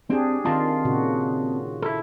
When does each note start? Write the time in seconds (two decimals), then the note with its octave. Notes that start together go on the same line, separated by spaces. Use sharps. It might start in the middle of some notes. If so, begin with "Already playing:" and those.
0.10 C4 D4 G4 G#4
0.45 D#3 C4 F4 D#5 A5
0.85 A#2 C#3 F#4
1.82 E4 A4